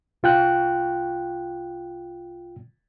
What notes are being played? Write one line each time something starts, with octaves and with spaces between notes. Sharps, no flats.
C2 F4 G5 F#6